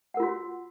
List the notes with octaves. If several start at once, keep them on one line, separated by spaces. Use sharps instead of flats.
F4 F#4 A#4 F#5